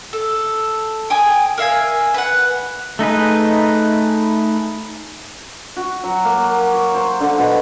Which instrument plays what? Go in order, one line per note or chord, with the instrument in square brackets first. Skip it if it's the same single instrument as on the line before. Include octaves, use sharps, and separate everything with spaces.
[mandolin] A4
G5 G#5 D#6
A#4 E5 F5 G#5
B4 F#5
[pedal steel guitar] A3 D#4 G#4 B4
[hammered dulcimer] F#4
F#3
A#3
C#5
C5
D3
B2